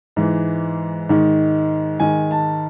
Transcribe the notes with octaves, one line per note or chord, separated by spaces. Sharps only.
G#2 E3
G#2 D#3
G#2 D#3 G#5
A5